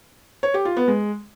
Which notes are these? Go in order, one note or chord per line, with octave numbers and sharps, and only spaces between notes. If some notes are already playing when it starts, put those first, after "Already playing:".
C#5
G4
F4
B3
G#3